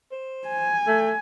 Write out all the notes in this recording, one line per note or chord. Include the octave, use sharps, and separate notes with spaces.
C5
G#5
A3